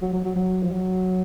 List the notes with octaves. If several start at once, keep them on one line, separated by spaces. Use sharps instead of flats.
F#3
F#3
F#3
F#3
F3
F#3